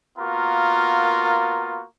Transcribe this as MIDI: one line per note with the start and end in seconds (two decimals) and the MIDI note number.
0.18 1.82 58
0.18 1.82 59
0.18 1.82 65
0.18 1.82 66
0.18 1.82 70